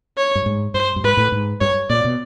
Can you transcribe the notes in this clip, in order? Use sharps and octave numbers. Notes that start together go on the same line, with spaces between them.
C#5
G2
G#2
G2 C5
G2
G#2 B4
A2
G#2
G2 C#5
A#2 D5
B2